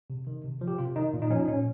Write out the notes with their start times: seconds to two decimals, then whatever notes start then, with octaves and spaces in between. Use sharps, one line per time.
0.10 C3
0.27 D#3
0.44 C3
0.61 F3
0.68 G4
0.78 C3 F4
0.96 D#3 D#4
1.13 A#2 F4
1.22 D#4
1.31 F3 C#4
1.40 D#4
1.48 A#2 C#4